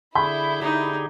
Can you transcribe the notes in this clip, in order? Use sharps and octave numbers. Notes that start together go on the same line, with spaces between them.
D3 E4 G#4 B5 G6
D3 D#4 G4 G#4